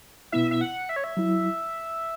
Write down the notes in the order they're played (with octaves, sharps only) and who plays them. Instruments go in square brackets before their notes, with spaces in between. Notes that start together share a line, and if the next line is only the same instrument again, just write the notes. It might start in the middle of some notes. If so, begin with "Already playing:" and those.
[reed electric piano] B2 B3 E4 [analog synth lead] E5
[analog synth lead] E5
F#5
E5
C#5
E5
[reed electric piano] F#3 E4